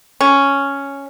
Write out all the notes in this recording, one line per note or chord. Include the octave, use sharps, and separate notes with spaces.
C#4